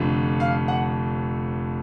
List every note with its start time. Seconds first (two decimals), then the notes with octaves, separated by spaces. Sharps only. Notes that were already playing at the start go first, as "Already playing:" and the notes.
Already playing: F1 F2 D3
0.40 F5
0.68 F#5